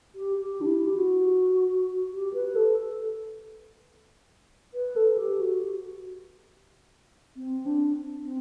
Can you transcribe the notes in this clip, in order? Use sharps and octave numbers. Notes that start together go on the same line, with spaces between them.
G4
G4
D4
E4
G4
F#4
G4
B4
A4
B4
A4
G4
F#4
C4
D4
C4